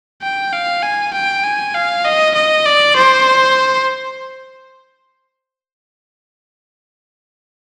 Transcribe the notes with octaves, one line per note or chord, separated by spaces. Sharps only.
G5
F5
G#5
G5
G#5
F5
D#5
D#5
D5
C5